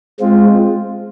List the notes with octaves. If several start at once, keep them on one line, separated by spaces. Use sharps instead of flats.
G#3 C4 F4